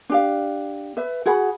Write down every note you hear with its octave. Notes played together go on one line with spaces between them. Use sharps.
D4 G4 F5
B4 E5
F#4 G#4 F#5 B5